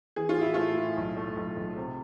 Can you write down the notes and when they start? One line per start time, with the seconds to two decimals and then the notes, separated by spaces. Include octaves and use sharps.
0.16 E3 G#4
0.29 F4
0.37 A2 E4
0.54 A3 F4
0.77 A2
0.97 B1
1.16 A3
1.37 B1
1.57 B1
1.77 C3